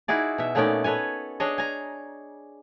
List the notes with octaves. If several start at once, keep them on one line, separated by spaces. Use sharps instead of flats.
D#4 E4 F#4 G#4 D5
B2 E5
A#2 A3 B3 C#4 D#4 D5
A4 B4 C#5 G#5
D4 G#4 C#5 D#5
G#5 A#5